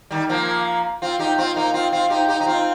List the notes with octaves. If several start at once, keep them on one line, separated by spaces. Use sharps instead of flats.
D#3 G3
F3 A#3
C4 F4
D#4 G4
C4 F4
A#3 D#4
C4 F4
C4 F4
D#4 G4
D#4 G4
D#4
C4 F4